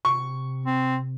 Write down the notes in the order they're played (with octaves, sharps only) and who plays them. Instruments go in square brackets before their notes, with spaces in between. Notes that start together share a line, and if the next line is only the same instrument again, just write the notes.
[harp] C3 [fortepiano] C#6
[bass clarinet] C4